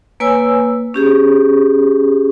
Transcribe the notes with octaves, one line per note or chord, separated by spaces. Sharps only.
A#3 B4 C#5 G#5 E6
C#4 G4 G#4